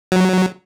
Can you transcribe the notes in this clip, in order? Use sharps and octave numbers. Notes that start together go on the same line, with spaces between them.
F#3